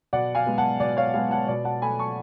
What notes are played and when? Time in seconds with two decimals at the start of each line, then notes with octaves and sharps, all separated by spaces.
0.13 B2 D5 F#5
0.35 F5 G#5
0.46 G#3 B3
0.58 F#5 A5
0.80 B2 D5
0.97 C#5 F5
1.14 G#3 B3 F5 G#5
1.31 F#5 A5
1.48 B2 D5
1.65 F#5 A5
1.82 A3 G#5 B5
1.99 A5 C#6